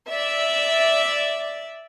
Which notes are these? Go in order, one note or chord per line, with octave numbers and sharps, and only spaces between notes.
D5 E5